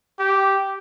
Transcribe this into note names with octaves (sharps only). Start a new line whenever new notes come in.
G4